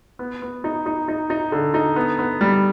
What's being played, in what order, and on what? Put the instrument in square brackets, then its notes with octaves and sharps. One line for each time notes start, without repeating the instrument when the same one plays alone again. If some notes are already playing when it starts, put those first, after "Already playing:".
[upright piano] B3
B3
D#4
D#4
D#4
D#4
D3
D#4
B3
B3
G3